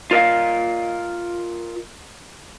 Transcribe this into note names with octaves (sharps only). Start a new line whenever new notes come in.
F4 A#4 D#5 F5